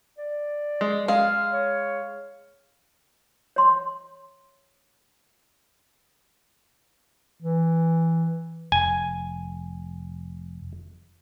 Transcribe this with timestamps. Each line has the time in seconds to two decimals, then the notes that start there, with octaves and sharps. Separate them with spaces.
0.18 D5
0.81 G#3
1.08 G#3 F5
1.53 C#5
3.56 C#5 C6
7.42 E3
8.72 F1 G#5